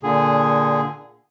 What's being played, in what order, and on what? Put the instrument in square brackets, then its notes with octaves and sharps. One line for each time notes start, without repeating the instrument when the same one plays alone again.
[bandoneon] A#2 D3 G#4